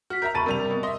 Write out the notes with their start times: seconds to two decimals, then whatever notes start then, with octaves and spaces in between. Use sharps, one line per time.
0.10 F#4 F6 B6
0.22 A#4 E5 A#5 G6
0.34 E1 A5 B5 C#6 A6 D#7
0.46 C3 G3 A#4 F7
0.70 B2
0.83 D#5 E5 C6